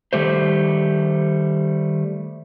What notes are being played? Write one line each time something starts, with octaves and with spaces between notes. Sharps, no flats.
D#3 G3 A3 C5